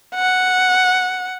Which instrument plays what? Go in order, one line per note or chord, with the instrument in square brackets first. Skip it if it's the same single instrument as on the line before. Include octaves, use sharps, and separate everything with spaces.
[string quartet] F#5